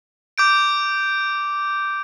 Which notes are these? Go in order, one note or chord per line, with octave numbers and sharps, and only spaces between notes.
D6 G6 D7